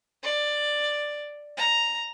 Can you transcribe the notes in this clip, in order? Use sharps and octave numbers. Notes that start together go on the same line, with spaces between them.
D5
A#5